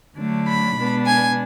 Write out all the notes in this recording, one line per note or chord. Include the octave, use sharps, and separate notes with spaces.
D3 F#3 A3 D4
B5
B2 G#3 B3 D4
G#5